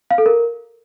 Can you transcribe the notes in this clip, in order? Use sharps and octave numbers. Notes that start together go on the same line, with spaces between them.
F5
A4
A#4